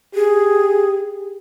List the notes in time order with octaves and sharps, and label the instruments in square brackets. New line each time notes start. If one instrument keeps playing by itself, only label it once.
[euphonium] G4 [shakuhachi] G#4